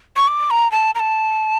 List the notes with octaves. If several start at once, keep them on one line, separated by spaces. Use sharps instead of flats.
C#6
D6
A#5
A5
A#5
A5